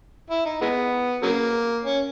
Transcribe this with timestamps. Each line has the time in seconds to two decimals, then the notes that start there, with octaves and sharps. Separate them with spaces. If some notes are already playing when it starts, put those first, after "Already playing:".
0.30 E4
0.45 D#4
0.61 E3 G#3 B3
1.23 C#3 F#3 A#3
1.85 C#4